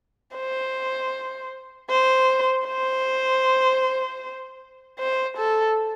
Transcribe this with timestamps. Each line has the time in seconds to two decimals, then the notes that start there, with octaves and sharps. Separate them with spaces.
0.36 C5
1.90 C5
2.67 C5
4.99 C5
5.38 A4